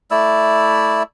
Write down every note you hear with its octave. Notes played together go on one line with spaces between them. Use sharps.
A3 E4 D5 E6